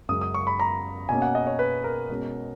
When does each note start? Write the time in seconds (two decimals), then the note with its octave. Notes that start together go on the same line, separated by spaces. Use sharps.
0.09 F#2 C#3 G#3 D#6
0.21 D#6
0.34 C#6
0.47 B5
0.60 A#5
1.09 B2 A#3 C#4 G#5
1.22 F#5
1.35 D#5
1.47 C#5
1.59 B4
1.84 A#4
2.10 B2 G#3 C#4